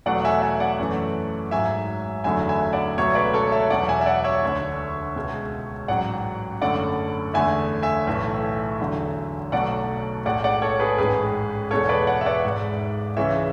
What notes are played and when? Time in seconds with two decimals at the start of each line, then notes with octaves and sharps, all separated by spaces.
0.06 E2 B2 F#3 A3 D5 F#5
0.25 E5 G#5
0.42 E5 G#5
0.60 D5 F#5
0.79 F#2 E3 A3
1.51 G#1 G#2 F#3 E5 G#5
2.24 F#1 E2 D3 F#3 A3 E5 G#5
2.49 E5 G#5
2.72 D5 F#5
2.97 C#2 B2 F#3 A3 C#5 E5
3.15 B4 D5
3.33 A4 C#5
3.52 C#5 E5
3.70 E1 E2 B2 F#3 D5 F#5
3.88 E5 G#5
4.01 E5
4.06 D5 F#5
4.24 C#5 E5
4.43 E1 D2 D3
5.16 C#2 B2 G#3
5.88 A1 G#2 F#3 D5 F#5
6.62 F#1 F#2 D3 A3 D5 F#5
7.34 E2 D3 A3 E5 G#5
7.82 E5 G#5
8.07 B1 A2 E3 A3
8.80 E2 D3 F#3
9.52 B1 B2 F#3 A3 D5 F#5
10.25 B1 A2 G#3 D5 F#5
10.44 D5 F#5
10.62 A4 C#5
10.80 G#4 B4
10.98 A1 G#2 G#3 G#4 B4
11.71 E2 B2 G#3 A4 C#5
11.89 B4 D5
12.07 D5 F#5
12.21 E5
12.26 B4 D5
12.44 G#1 G#2 G#3
13.17 C#2 C#3 E3 G#3 C#5 E5